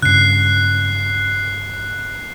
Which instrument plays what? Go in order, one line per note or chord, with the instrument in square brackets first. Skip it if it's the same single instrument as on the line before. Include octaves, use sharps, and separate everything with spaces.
[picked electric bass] G2 C#3 [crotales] F#6 C7